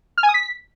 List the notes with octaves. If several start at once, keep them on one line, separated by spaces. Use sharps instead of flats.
F6
G#5
D#6
B6